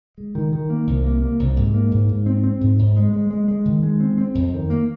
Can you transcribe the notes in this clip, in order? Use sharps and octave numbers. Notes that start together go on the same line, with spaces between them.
G#3
D#3
D#3
A#3
C2
A#3
A#3
C2
G#2
A#3
G#2
G#2
C4
C4
G#2
G#2
G#3
G#3
G#3
G#3
D#3
G#3
C4
C4
F2
D#3
A#3